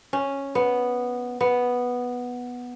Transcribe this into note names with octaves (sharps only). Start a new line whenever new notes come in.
C#4
B3
B3